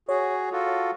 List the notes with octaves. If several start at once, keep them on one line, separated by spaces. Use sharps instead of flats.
F#4 G#4 C#5
F4 F#4 A4